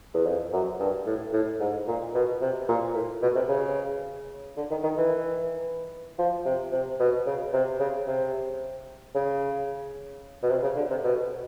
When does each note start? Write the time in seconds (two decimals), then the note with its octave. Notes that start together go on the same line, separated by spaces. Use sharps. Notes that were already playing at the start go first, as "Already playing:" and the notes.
0.14 E2
0.26 F2
0.53 F#2
0.80 G2
1.07 A2
1.33 A2
1.60 G#2
1.88 A#2
2.15 B2
2.41 C3
2.69 A#2
2.95 A2
3.22 B2
3.35 C3
3.49 C#3
4.57 D3
4.71 D#3
4.84 D#3
4.98 E3
6.19 F3
6.46 C3
6.72 C3
7.00 B2
7.26 C#3
7.53 C3
7.80 C#3
8.07 C3
9.15 C#3
10.43 B2
10.50 C3
10.63 C#3
10.76 D3
10.90 C3
11.04 B2